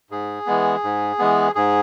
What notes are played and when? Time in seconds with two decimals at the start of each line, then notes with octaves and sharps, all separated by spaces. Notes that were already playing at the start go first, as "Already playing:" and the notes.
0.10 G#2 G#4
0.46 E3 G#3 B3
0.84 G#2
1.19 E3 G#3 B3
1.55 G#2 G#4